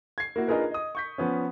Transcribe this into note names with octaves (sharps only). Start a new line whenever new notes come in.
G#6 C7
A#3 E4 F#4
D4 D#4 F4 G#4 A#4 B4
D#5 D#6
C#6 G6 B6
F3 B3 C#4